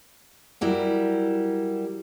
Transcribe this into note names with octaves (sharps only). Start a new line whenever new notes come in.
F#3 G3 E4 A#4